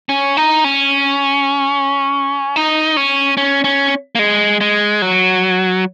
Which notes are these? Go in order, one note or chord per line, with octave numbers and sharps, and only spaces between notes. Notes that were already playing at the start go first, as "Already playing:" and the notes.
C#4
D#4
C#4
D#4
C#4
C#4
C#4
A#3
G#3
G#3
F#3